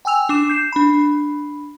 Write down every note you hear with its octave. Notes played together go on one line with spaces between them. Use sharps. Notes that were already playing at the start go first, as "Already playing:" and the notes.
G5 G#5 E6 F7
D4 D6 E7
G6 C7 E7
D4 B5